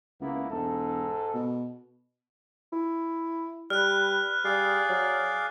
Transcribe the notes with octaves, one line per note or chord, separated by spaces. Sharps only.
C#2 A#3 B3 E4
E1 G#2 A4
B2
E4
G3 B4 F6 F#6
G3 G#4 D5 F5
F#3